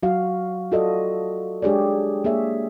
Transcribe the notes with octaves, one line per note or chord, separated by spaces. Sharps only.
F#3 F#4 F5
F4 F#4 A4 D5 D#5
G#3 D4 G4 G#4 C#5 D5
A#3 G#4 C#5 E5